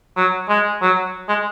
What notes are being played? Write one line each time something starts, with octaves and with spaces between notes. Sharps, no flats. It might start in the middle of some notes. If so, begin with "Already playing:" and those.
F#3
G#3
F#3
G#3